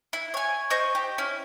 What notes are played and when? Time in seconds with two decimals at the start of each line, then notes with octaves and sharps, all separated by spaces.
0.13 E4
0.34 C#5 G#5
0.70 C5 D#5 C#6 G6
0.95 G4
1.18 C#4 E4